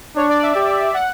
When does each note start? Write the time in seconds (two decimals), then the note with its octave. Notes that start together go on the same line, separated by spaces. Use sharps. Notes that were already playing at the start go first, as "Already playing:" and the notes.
0.16 D4 C#5
0.29 D5
0.43 E5
0.55 G4
0.94 F#5